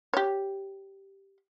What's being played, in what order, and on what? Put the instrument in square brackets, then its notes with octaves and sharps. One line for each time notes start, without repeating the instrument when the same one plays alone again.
[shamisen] G4 C#5